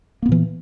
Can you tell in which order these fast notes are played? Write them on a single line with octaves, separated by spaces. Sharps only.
A#3 B3 A#2 E3